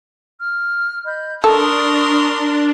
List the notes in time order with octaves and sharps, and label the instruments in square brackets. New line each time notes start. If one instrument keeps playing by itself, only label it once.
[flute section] F6
D#5 B5 G6
[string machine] D4 [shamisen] A4 [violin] A#4 C6 [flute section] C#6 D#6